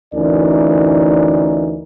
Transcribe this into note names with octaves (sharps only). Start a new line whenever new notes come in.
D2 E3 C#4 D#4 A#4 D5